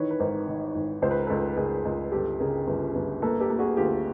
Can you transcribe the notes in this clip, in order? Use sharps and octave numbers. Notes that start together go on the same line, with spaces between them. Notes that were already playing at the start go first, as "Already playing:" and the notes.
Already playing: D#3 E3 B4 C#5
B4
G#1 A#4 C5
D#3
G#1
C#2 C5
B4
A#4
C#2 A4 B4
C#2 G#4 A#4
C#2
G1 G4 A4
C#3 G#4 A#4
G1
G1
A#3 A4 B4
G4 A4
A#3
F#4 G#4
D2 F4 G4
G#4